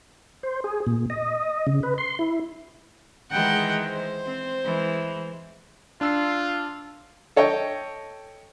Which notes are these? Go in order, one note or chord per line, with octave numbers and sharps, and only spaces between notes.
C5
G#4
A#2
D#5
C#3
B4
C6
E4
D#3 E3 G#3 F#5 G5
C5
C4
E3 G#3
D4 F4 E6 C7
A4 C#5 D#5 G5